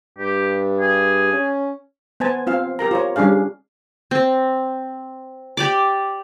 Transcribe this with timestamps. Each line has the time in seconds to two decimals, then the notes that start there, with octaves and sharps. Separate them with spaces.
0.18 G2 G4
0.79 G#4
1.33 C#4
2.20 B3 C5 G#5 A5
2.47 C4 F4 F5
2.79 G4 A#4 A#5
2.91 F4 C5 C#5
3.16 G3 C#4 D4 G#4 F5
4.11 C4
5.57 G4 D5 D6